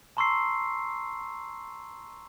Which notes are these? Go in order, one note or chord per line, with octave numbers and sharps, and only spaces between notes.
A5 A#5 C6 C#6 E6 C7